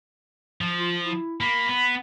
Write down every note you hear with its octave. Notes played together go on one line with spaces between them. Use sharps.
F3
F4
E4
A#3 B5
B3